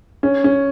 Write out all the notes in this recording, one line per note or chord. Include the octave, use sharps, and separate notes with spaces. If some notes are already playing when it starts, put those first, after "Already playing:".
C#4
C#4